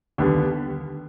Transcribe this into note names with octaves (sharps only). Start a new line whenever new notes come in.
D#2 D3 G3 B3